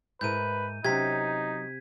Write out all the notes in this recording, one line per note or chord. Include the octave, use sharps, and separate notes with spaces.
G#2 E4 A#4 B4 G6 D#7
C3 F#3 C#4 D#4 G#6 B6